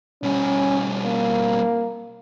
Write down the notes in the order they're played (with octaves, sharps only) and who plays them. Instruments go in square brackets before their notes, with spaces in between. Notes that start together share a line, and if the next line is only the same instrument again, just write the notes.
[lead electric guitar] B2 G3 [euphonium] C#4
[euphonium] A#3